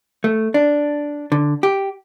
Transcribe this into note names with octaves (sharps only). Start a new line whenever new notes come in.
A3
D4
D3
G4